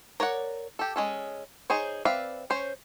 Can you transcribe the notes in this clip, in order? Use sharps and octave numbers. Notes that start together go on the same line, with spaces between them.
A#4 C#5 D5 F#5
G4 A4
G#3 C#4 A4
D#4 G#4 C5 C#5
C4 B4 D5 E5 F5
C#4 C5 C#5